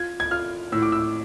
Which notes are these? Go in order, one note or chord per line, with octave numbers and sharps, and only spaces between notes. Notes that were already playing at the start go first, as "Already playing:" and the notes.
Already playing: F4 G#6
G#6
F4 F6
A2 E6
D6
E6